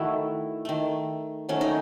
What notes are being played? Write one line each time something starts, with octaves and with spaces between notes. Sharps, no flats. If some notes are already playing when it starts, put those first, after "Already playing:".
Already playing: D#3 A3 E4 F#4 C5
D#3 A3
D#3 F#3 A3 C#4
D#4